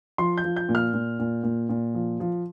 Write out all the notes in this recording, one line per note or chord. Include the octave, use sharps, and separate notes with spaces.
F3 C6
G6
F3
G6
A#2
F6
A#2
A#2
A#2
A#2
F3
F3